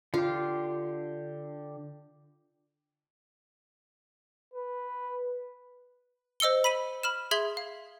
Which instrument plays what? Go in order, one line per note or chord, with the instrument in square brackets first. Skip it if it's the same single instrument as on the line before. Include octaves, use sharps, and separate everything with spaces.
[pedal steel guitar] D3 G4 [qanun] F4
[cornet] B4
[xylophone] C5 D#5 E6 C#7 G7
B5 B6 D#7 F#7
B5 F6 E7
G#4 E5 C6 G#6 F#7
F5